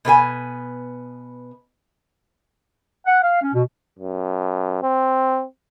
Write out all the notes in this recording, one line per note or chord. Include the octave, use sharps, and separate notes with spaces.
B2 B3 A#4 G#5
F#5
F5
C#4
B2
F#2
C4